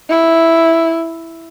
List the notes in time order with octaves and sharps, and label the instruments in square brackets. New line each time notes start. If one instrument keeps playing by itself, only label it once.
[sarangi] E4